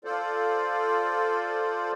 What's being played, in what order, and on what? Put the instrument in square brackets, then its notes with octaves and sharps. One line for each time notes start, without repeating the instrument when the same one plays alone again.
[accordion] F4 A4 C5 D5